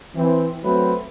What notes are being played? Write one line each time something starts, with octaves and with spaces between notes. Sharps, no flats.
E3 C4
F#3 A3 C4 B4